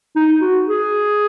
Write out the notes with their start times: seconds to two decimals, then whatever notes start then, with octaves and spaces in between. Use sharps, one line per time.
0.16 D#4
0.41 F#4
0.66 G#4